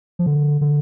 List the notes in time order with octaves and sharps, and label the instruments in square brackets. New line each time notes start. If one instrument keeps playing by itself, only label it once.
[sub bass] F3
D3
D3